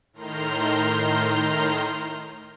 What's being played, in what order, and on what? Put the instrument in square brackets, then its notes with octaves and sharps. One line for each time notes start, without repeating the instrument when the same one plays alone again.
[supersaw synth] A2 D#3 A#5 C6 F6 G6